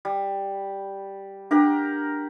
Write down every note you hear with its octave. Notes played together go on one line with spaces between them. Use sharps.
G3
D4 G4 A#4 F#5